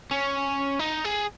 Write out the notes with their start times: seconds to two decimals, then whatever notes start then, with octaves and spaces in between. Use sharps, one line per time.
0.11 C#4
0.79 D#4
1.05 G#4